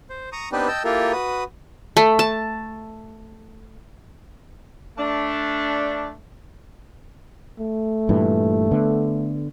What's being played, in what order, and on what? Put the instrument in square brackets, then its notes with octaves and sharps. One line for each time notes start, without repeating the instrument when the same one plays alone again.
[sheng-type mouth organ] C5
A#5 C#6 D#6
B3 C4 D4 D#4 G4 B4
D#5 G5 A5 E6
A#3 E4 F4 G4 A4 A#4
F#4 B4 D#6
[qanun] A3
A5
[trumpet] A3 [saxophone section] D4
[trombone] A3
[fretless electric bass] G2 A#2 E3
D3 B3